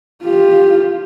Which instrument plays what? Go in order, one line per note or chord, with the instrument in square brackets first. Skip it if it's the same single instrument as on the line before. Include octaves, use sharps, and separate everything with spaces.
[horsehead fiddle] F4 G4